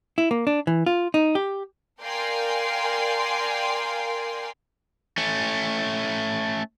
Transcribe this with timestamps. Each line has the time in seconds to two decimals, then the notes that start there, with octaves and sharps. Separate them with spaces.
0.18 E4
0.31 A#3
0.47 D4
0.67 E3
0.86 F4
1.14 D#4
1.35 G4
2.02 A#4 D5 F5 G5 G#5 C6
5.18 A3 C#4